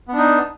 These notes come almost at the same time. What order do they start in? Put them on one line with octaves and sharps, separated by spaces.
B3 D4 D#4